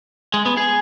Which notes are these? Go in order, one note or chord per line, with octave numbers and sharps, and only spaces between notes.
G#3
B3
G#4